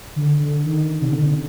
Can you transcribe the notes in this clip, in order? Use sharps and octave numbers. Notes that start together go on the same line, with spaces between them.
D3
D3
D#3
C3
D3